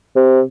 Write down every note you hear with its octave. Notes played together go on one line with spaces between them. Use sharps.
C3